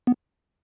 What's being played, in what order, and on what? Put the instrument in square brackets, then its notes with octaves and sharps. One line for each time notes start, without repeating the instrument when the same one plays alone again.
[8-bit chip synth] B3